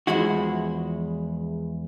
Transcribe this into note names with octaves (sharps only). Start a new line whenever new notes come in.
E2 F3 G#3 E4 F#4